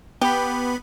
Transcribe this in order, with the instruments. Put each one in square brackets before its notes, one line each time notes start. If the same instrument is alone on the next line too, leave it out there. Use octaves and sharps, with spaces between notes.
[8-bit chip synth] B3 B5 [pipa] G4